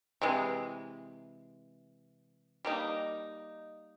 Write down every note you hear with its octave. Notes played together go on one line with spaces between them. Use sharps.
C3 E3 G#3
G3 A#3 D#4